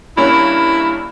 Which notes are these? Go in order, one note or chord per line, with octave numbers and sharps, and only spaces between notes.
G2 A#3 C#4 E4